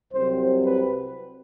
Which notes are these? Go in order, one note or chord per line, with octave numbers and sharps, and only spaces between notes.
C2 C3 F#3 C4 C5
B4